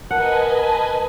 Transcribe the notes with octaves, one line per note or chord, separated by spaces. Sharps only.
A#4 B4 D#5 F#5 G#5 A5